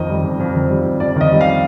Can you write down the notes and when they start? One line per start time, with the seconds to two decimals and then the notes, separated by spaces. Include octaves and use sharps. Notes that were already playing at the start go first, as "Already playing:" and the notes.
Already playing: F2 D#3 D#5
0.10 G3
0.24 F2
0.40 F2
0.55 D#3
0.70 G3
0.86 F2
1.00 F2 D5
1.16 D#3 D#5
1.31 G3
1.41 F5